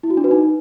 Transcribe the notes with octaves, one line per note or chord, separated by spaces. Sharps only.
E4
F#4
D4
B4
D#4